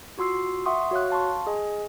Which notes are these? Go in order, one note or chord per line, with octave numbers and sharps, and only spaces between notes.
F4 F#4 C6 E6 C7
E5 F#5 C6 C#6 D#6
F#4 C#5 F5 F#6
F5 A5 C6 C#6
G#4 D#5 G#5